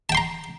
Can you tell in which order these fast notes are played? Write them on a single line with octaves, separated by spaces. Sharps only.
A5 G5 C6 A#5